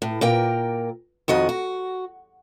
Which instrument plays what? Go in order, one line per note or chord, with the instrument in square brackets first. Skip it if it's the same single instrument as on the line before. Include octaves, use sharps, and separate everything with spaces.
[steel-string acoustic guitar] A2
A#2 A#4 G5
F2 D#3 F#4 D#5
F#4